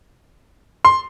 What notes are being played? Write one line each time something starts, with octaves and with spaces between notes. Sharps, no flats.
C6